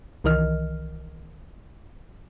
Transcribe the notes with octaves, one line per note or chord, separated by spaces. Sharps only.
C2 D#3 E3 A#4 D#5 F6